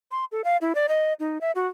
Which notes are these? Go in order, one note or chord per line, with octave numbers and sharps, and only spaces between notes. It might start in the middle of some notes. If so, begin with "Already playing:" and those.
C6
A4
F5
E4
D5
D#5
D#4
E5
F#4